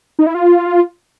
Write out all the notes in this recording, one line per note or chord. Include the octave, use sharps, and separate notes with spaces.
D#4
E4
F4